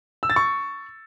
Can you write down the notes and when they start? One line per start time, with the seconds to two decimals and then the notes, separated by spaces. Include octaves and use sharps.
0.23 E6
0.30 A6
0.36 C#6